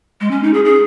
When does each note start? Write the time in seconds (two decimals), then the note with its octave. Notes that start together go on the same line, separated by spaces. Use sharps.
0.21 G#3
0.31 C#4
0.43 D#4
0.54 G#4
0.65 G#4